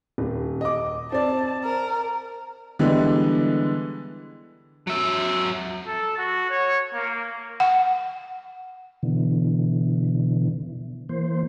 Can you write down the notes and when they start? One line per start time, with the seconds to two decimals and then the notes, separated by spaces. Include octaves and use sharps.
0.18 D#1
0.61 D#5 D6
1.12 C4 D5 A5
1.64 A#4
2.79 D3 E3 G3 G#3 B3
4.87 F#3 E5
5.87 A4
6.18 F#4
6.50 C#5
6.94 A#3
7.60 F#5
9.03 B2 D3 E3
11.09 E3 A#3 C5